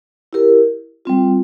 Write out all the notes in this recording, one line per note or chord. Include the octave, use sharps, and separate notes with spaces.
E4 G4 A#4
G3 C4 F4